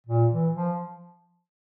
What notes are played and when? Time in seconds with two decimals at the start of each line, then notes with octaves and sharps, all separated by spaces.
0.07 A#2
0.32 E3
0.56 F3